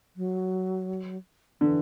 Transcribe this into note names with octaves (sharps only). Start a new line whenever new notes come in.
F#3
D3 E3